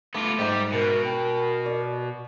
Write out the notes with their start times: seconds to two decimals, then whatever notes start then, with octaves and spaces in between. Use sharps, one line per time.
0.14 A3 B3 F4 D6
0.39 G#2 G3 G4 E5
0.72 B2 A#4
1.05 A#4 G5
1.66 D5